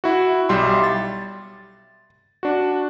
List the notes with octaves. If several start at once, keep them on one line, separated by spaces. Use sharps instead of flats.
E4 F#4
B1 G3 E5 C6
A6
D4 F#4